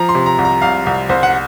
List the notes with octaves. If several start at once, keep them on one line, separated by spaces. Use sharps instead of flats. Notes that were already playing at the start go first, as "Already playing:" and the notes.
Already playing: F3 A#5
C6
C3
A#5
C2
A#5
C2 F5
C2
C2 C5
F#5